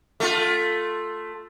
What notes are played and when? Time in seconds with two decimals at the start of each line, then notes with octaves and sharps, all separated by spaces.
0.20 A3 F4